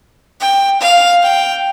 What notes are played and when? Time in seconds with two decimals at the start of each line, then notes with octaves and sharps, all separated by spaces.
0.41 G5
0.81 F5
1.22 G5